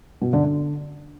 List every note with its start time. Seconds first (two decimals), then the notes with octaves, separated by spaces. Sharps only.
0.22 B2
0.33 D3
0.45 D3